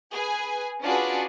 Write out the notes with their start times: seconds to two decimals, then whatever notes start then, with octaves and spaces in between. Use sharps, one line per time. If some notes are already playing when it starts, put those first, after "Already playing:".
0.13 G#4 B4 G#5
0.83 C#4 D4 F4 F#4 G#4 B4